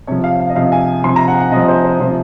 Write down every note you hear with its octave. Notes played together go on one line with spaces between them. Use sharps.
C3 F3 C#5
F5
F5
D#5
C3 F3 F5
G#5
C3 F3 C6
A#5
F#5
F#5
C3 F3 D#5
C5
C5
C3 F3 C5